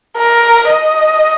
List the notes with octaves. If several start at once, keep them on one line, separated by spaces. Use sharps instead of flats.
A#4
D#5